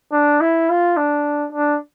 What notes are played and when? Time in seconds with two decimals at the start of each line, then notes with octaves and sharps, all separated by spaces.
0.12 D4
0.41 E4
0.69 F4
0.97 D4
1.53 D4